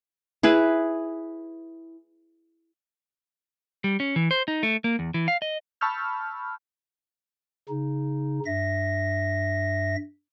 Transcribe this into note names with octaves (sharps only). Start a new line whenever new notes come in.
E4 G#4 B4
G3
C#4
E3
C5
D#4
A3
A#3
E2
E3
F5
D#5
A5 B5 C#6 E6 F6 G6
C#3 D#4
G2 E5 A#6